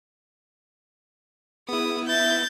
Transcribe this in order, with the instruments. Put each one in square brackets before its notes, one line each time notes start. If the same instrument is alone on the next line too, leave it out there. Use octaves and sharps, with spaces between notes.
[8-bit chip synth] B3 E4 [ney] G#4 [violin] D#6
[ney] E5 [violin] G6 A6